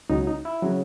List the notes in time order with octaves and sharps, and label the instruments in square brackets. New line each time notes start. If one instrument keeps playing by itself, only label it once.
[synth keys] C#2 C#3 F#3 D#4
D#4
E4
C#3 F#3